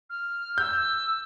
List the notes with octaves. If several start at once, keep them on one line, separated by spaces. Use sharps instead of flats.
F6
E6 G6